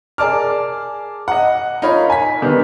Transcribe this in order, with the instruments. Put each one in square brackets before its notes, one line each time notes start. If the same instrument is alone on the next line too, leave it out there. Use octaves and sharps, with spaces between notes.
[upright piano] G#4 A#4 D5 A5 D6 F6
D#5 F#5
D#4 F4 A#4 C#5 B5
G#5 B6
D3 D#3 G3 B3